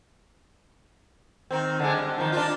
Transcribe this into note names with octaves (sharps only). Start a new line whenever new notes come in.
D#3 C4
D3 G#3
G3
D#3 F3
D4 F4